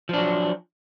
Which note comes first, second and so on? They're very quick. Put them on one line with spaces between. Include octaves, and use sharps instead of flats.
F3 D4 F#3